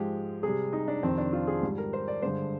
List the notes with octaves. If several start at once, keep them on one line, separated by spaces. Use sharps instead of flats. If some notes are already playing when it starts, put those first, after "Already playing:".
Already playing: G#2 F3 G#3 G4
C3 G3 G#4
D#4
D4
F2 C3 D#3 C4
D4
F4
G#4
G#2 G3
A#4
C5
D5
G2 D3 G#3 C5